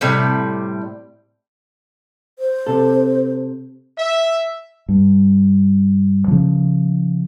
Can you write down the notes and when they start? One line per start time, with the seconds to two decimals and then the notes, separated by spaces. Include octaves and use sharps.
0.01 A2 C3 G3
2.39 C5
2.67 C3 A4
3.98 E5
4.89 G2
6.28 C#3 F3